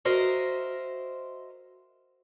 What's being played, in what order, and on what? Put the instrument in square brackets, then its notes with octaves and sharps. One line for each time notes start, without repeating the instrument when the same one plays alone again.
[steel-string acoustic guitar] F#4 A#4 C5 D#5 E5